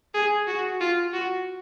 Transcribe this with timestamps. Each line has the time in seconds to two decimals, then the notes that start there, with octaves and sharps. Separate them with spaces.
0.14 G#4
0.47 F#4
0.80 F4
1.13 F#4